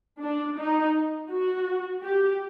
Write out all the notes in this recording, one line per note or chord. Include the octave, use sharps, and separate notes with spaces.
D4
D#4
F#4
G4